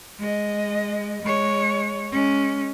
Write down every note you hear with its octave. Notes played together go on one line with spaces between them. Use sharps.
G#3 D#5
G#3 C#5
G#3 C#4